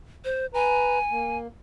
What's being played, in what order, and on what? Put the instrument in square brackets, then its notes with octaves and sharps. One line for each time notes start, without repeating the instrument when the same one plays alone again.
[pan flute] C5
[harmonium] B4 A#5 [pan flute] G#5
[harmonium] A#3